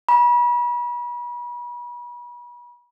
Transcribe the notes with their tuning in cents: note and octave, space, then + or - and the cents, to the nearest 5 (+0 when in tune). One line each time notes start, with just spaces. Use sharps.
B5 -35